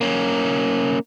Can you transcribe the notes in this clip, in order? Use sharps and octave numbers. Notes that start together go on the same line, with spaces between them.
A#3 C#4